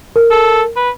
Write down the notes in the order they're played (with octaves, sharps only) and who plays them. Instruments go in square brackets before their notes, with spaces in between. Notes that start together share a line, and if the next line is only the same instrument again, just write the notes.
[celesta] A#4
[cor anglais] A4
B4